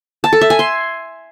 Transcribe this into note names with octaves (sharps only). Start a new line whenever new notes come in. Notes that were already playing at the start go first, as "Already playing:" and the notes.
A5
A4
E5
G#5
C6